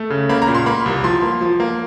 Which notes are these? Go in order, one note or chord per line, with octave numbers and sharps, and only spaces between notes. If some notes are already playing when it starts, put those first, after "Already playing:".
Already playing: A3
C#3
A#3 B5
A#5
A#2
C6
A#3 B5
C2
F3 C6
A#3
F3
A#3